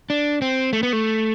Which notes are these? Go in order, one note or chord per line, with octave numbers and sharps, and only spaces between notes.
D4
C4
A3
B3
A3